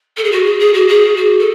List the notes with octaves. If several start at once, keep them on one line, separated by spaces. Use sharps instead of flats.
A4
G#4
F#4
G#4
G#4
F#4
G#4
F#4
A4